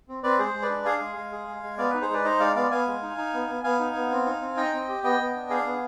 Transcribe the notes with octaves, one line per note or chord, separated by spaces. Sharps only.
C4
C4 B4 D5
G#3 G#4 C5
G#3
B4 D5
D4
G#4 F5 G#5
G#3
G#3
G#4
G#3
G#3
B3 D5 F5
D#4 B4
G#4 C5
G#3 B4 D5
D#4 C5 D#5
G#3 D5 F5
B3 D5 F5
B3 F5 G#5
G#3
D#4
D#4
B3
B3
B3 F5 G#5
D#4
B3
C4
D#4
C4
D#4 D#5 G5
C4
G4
B3 D#5 G5
B3
D4
G#4 F5 G#5
B3